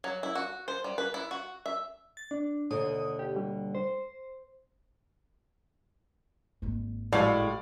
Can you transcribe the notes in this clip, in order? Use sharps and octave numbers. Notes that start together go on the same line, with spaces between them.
F#3
E4
F#4
C5
G3
B4
E4
F#4
E5
A6
D4
D#2 B2 D3 D#6
G4
G3
C5
G#1 A#3
A2 G3 G#3 F#4 D5 F5